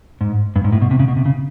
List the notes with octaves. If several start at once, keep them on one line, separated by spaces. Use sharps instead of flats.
G#2
G2
G#2
A2
B2
C3
C#3
B2
C3
C#3